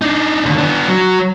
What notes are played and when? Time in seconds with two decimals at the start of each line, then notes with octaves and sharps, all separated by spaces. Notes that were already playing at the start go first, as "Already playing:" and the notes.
0.02 D4 D#4
0.45 D#2 D3
0.58 B3 D4
0.88 F#3